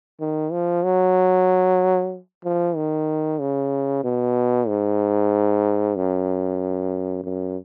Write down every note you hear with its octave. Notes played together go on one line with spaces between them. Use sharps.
D#3
F3
F#3
F3
D#3
C#3
B2
G#2
F#2
F#2